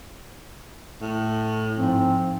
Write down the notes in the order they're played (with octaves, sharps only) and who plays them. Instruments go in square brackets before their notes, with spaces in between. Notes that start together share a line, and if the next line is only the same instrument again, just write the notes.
[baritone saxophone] A2
[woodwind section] G#2 F3 C4